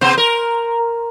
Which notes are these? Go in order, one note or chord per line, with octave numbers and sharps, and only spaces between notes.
C3 B3 C5
A#4